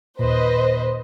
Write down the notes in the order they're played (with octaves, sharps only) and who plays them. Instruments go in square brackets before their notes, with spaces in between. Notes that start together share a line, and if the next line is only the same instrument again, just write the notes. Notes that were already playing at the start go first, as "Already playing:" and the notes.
[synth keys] D#2 A#2 [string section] B4 C5 D#5